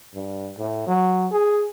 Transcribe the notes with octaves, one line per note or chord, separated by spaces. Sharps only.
G2
A2
F#3
G#4